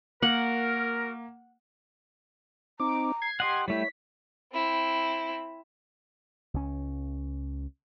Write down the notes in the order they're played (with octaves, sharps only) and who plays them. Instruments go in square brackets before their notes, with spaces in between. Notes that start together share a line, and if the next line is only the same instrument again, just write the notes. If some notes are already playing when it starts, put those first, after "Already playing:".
[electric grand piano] A#3 [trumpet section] F#4 A#4 [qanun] F#5
[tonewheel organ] C4 D#4 [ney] A#5 [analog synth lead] D6
[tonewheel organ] G#6 [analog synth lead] C7
[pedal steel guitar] G4 D#5 F#5 [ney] C6
[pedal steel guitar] G3 A3 G4 [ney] E4 [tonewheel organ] C#5 [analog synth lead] B6
[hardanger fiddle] C4 E4
[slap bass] C#2 C#4